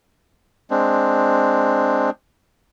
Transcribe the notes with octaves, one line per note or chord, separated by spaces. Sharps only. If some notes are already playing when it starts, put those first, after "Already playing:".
G#3 C4 D4